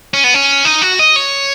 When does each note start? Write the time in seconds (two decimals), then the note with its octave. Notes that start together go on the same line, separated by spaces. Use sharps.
0.14 C#4
0.24 B3
0.34 C#4
0.65 D#4
0.82 F#4
0.99 D#5
1.16 C#5